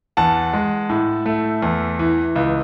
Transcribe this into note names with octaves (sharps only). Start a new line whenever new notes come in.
E2 F#5 A5
G#3
A2
A3
E2
E3
C#2